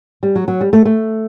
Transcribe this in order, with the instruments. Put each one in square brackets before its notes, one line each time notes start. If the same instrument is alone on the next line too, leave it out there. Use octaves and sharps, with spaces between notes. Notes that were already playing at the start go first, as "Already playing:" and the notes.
[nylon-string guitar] G3
F#3
F#3
G3
A3
A3